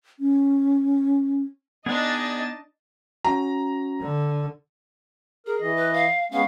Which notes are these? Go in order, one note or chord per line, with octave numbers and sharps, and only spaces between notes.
C#4
B3 D4 D#4 G#4 D5 D#5 F#6 A6
C#4 F#4 A#5
D3
G#4 A#4
E3 D#5
B4
F5
G#3 B3 C#4 F5